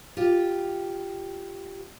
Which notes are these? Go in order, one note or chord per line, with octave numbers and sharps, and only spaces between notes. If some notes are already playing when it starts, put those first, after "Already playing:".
F4 G4